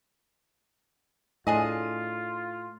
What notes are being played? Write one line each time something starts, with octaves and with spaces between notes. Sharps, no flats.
A2 D4 F4 G#4 D#5